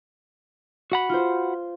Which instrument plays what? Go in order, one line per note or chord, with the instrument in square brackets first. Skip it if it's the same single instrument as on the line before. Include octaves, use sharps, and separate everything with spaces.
[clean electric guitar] F#4 F#5 B5
[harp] F4 C5